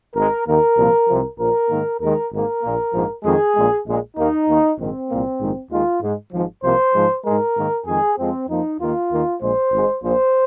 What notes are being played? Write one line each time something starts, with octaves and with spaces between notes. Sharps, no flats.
G#1 G#2 G#3 A#4
D#2 D#3 A#3 A#4
C2 A#2 F3 A#3
C2 C3 F3
A#1 A#2 F3 A#4
G#2 D#3 A#3
D#2 D#3 G#3 A#4
G#1 G#2 D#3 A#3 A#4
A#1 A#2 A#3
A#1 G#2 F3 A#3
F2 D#3 G#3 G#4
A#1 A#2 G#3
A#1 A#2 G#3
D#2 D#3 A#3 D#4
D#2 D#3 A#3
A#1 G#2 D#3 C4
C2 A#2 A#3
A#1 G#2 D#3 G#3
D#2 D#3 G#3 F4
G#2 G#3
G#1 G#2 F3
C2 C3 F3 A#3 C5
G#2 F3 G#3
G#2 G#3 A#4
G#2 D#3 A#3
F2 D#3 G#3 G#4
F2 F3 G#3 C4
F2 F3 A#3 D#4
D#2 D#3 A#3 F4
D#2 D#3 A#3
A#1 A#2 G#3 C5
G#1 G#2 G#3
A#1 A#2 F3 C5